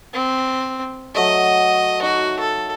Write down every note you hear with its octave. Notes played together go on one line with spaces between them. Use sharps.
C4
F#3 A3 D#5 E5
D#4 F#4
A4